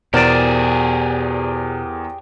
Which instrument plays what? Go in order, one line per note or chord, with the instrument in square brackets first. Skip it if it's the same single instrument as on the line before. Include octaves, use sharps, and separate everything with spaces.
[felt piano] E2 A#4 [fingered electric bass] B2 [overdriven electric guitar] G4 G#4 [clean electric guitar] C5 D5